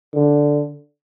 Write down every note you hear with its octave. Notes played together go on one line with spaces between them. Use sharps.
D3